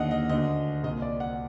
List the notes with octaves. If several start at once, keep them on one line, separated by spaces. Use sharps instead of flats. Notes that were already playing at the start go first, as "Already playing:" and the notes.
Already playing: D#2 D3 D#5 F#5
D#5
D2 D3 D#5
C2 A#2 D#5
D5
F#5